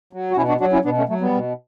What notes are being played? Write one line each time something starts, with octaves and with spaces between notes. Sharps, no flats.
F#3
F#4
B2 C#4 E4
D4 F#4
F#3 D4 F#4
C#4 E4
B2 B3 D4
A3 C#4
F#3 A3
G3 B3
B2